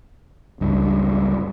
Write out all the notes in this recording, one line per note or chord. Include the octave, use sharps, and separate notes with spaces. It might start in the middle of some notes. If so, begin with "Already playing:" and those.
G1 C#2 G2